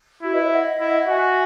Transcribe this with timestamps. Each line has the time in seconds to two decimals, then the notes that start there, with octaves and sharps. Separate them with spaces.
0.22 E4 F#4
0.33 B4 D#5
0.41 C#5 E5
0.51 D#5 F#5
0.80 E4
1.08 F#4 E5 G#5